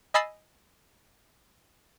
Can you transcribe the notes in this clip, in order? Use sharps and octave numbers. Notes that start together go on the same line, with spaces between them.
D#5 G#5 B5 E6 A6 C7